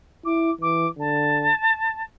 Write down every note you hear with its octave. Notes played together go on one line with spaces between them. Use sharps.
E4 D6
E3 D6
D3 A5